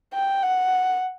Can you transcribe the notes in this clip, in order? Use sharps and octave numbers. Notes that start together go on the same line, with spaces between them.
G5
F#5